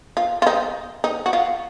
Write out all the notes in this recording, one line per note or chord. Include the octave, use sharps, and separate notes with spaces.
F4
F4
D#4
D#4
F#4
F4